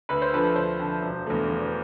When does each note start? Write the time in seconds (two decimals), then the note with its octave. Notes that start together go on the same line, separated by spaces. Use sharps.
0.09 D2 B4
0.22 C5
0.33 D3 F3 B4
0.56 D2 C5
0.79 D3 F3
1.02 E1
1.26 E2 D3 A3
1.49 E1